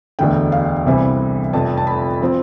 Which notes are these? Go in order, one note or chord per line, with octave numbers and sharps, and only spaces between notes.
E1 D2 D3 G5
F5
C2 C3 E3 G3 C4
F1 F2 C3 A5
A5
B5
F3 C4